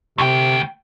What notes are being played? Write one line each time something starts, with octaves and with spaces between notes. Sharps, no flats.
D2 C3 G5